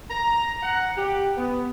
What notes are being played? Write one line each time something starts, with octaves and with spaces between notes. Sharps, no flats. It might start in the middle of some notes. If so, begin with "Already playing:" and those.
A#5
F#5
G4
B3